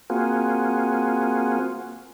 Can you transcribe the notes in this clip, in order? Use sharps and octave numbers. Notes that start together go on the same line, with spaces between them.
A#3 C4 F4 F#4 G#4